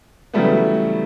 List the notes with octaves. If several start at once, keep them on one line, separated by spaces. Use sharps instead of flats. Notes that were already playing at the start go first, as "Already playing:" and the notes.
C#3 E3 F#3 G3 A3 B3